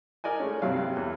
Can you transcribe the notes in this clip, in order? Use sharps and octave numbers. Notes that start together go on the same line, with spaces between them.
A#4 D5 D#5 G#5
G#3 A3 C#4
G2 C3 F#3 F5
E2